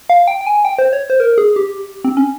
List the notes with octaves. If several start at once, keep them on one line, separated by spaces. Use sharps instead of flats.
F5
G5
G5
G#5
G5
C5
C#5
C5
A#4
G#4
G4
C4
C#4